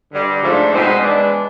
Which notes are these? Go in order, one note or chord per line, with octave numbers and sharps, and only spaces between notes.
G2 D3 G3
G#2 F3 A3 D4
B2 G#3 C4 D#4 C5
E3 G#3 B3 D4